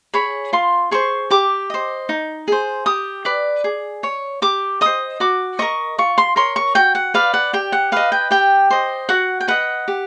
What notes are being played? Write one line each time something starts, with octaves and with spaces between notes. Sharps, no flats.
G#4 C#5 B5
F4 C6
G#4 C5 C#6
G4 D6
C5 D#5
D#4
G#4 C5
G4 D#6
B4 D5
G#4
C#5
G4 D6
C5 D#5 D#6
F#4 D6
A#4 D#5 C#6
F4 C#6
C6
A#4 C#5 C6
C#6
F#4 G5
F#5
B4 D5 F5
F#5
G4 G5
F#5
B4 D#5 F5
G5
G4 G5
C5 D#5
F#4 F#5
G5
B4 D#5 F#5
G4